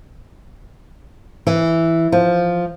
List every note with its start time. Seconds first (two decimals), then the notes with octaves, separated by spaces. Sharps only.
1.47 E3
2.12 F3